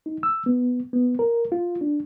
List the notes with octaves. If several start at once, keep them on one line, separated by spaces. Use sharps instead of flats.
D#4
E6
B3
B3
A#4
F4
D4